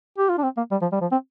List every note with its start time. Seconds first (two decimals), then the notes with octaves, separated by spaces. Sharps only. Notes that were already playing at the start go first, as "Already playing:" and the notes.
0.18 G4
0.29 F4
0.38 D4
0.43 C4
0.57 A#3
0.71 G3
0.82 F3
0.92 G3
1.01 F3
1.12 C4